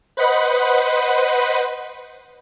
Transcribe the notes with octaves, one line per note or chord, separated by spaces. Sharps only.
B4 C5 D#5 F#5 B5